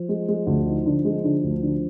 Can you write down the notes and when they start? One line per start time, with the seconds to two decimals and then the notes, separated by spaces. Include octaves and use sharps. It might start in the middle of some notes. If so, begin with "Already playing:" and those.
Already playing: F3
0.09 G#3
0.28 G#3
0.47 D2
0.66 D#4
0.86 D3
1.05 G#3
1.24 D3
1.43 D2
1.62 D3